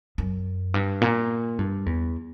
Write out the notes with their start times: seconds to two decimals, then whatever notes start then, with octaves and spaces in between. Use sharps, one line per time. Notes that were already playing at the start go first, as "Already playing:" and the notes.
0.18 F#2
0.74 G2
1.01 A#2
1.59 G2
1.86 E2